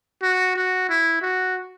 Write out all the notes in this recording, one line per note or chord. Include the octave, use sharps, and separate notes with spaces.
F#4
F#4
E4
F#4